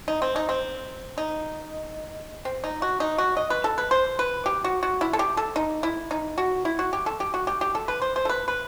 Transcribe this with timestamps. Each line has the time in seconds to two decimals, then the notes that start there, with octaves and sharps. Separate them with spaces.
0.08 D#4
0.22 C4
0.36 D#4
0.49 C4
1.18 D#4
2.45 C4
2.64 D#4
2.82 F#4
3.00 D#4
3.18 F#4
3.37 D#5
3.50 B4
3.64 A4
3.78 B4
3.91 C5
4.19 B4
4.46 G4
4.64 F#4
4.83 F#4
5.01 E4
5.13 A4
5.19 G4
5.37 A4
5.56 D#4
5.83 E4
6.11 D#4
6.38 F#4
6.65 E4
6.79 F#4
6.93 G4
7.06 A4
7.20 G4
7.34 F#4
7.47 G4
7.61 G4
7.75 A4
7.88 B4
8.02 C5
8.16 C5
8.25 A4
8.29 B4
8.48 B4